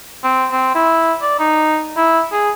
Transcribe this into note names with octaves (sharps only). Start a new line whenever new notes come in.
C4
C4
E4
D5
D#4
E4
G#4